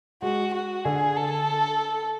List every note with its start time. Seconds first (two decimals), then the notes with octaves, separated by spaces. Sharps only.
0.22 G#3 F#4
0.53 F#4
0.85 D3 G#4
1.17 A4